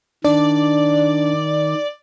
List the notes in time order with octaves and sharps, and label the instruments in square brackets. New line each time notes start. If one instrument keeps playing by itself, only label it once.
[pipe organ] D#3 [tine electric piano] D4 [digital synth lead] D5